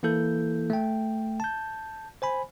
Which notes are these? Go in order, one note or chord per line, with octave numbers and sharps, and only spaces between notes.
E3 A#3 E4 A4 G6
A3 G5
A5 G6
C5 G#5 B5